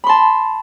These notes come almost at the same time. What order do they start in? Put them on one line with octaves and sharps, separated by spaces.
B5 C6 A5